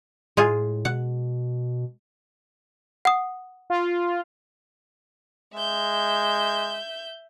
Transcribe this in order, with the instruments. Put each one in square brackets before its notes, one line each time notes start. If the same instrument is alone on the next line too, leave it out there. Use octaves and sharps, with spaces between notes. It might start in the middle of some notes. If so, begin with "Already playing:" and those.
[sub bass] A2 [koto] G#3 F4 G#4
[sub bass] B2 [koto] F#5
[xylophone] F#5 D#6
[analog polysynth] F4
[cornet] G#3 [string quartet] E5 G6